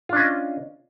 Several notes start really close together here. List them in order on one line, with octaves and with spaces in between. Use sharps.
F4 D4 C#4 D#5